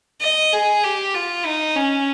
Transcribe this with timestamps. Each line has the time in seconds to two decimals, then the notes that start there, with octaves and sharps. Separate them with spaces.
0.21 D#5
0.53 G#4
0.83 G4
1.14 F4
1.45 D#4
1.76 C#4